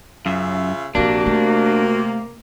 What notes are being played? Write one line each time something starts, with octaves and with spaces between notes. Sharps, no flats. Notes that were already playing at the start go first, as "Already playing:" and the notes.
F#2 C#3 F4 E5
A#1 C3 F3 A#3 D4 F#4
A3